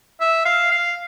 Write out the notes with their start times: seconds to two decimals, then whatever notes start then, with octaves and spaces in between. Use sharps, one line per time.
0.20 E5
0.45 F5
0.71 F5